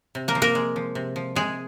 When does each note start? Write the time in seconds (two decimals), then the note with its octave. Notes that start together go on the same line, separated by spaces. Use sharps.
0.15 C3
0.28 A#3 A#4
0.35 F3
0.42 A#3 A#4
0.55 G#3
0.76 F3
0.95 C3
1.16 F3
1.36 C3 G#3 G#4